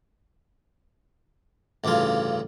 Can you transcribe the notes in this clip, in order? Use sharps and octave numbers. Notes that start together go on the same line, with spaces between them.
A1 D2 G2 C#3 F4